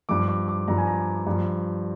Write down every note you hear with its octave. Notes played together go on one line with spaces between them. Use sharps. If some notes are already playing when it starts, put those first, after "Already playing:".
G2 F3 D6
D6
D6
G2 F3 A#5
G#5
A#5
G2 F3